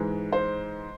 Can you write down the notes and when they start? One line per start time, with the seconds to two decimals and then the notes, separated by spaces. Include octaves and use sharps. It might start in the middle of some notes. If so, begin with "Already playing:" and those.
Already playing: G#2 E3 G#3
0.33 C5